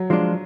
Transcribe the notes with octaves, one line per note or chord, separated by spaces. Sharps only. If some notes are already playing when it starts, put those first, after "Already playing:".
Already playing: F#3
F3 G#3 D4 F4